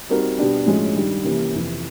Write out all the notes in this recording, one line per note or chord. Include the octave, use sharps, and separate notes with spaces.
G3 C4 D#4 F#4 A#4
B2 G3 B3 D4 G4
A2 F3 G#3 C#4 F#4
G2 D#3 G3
C3 E3 G3 A#3 C#4
F2 C3 E3